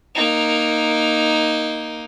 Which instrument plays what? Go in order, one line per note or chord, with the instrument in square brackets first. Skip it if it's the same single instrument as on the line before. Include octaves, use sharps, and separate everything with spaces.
[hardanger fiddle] A#3 D#4